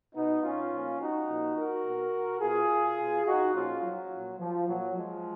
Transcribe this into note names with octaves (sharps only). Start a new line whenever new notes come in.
B2 B3 D#4
C#4 F4
A#2 F3
D#4 F#4
A#2 F3
F#4 A#4
B2
B2 F4 G#4
B2
D#4 F#4
A#2 F3 C#4 F4
F#3
A#2 F3
F3
A#2 F3 F#3
F3 G#3